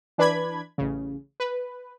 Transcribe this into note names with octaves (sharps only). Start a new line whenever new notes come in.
E3 D4 B4 D5 B5 G#6
A1 C#3
B4